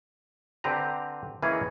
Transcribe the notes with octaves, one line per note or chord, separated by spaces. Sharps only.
D3 C4 G4 B4 A#5
E3 A#3 C#4 D#4 G#4 C#5